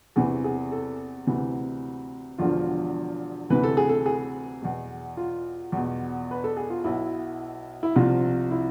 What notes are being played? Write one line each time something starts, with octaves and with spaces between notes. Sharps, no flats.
E2 C3 E3 G#4
G#4
A4
D2 C3 E3
E1 E2 D3 F3 F4
D2 C3 E3 B4
A4
G#4
A4
G#4
E2 B2
F4
E2 B2
B4
A4
G#4
F4
B1 B2 E4
E4
C2 C3 F3 F4
E4